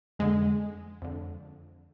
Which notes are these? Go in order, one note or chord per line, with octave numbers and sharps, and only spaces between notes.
F2 D3 G#3
F2 D3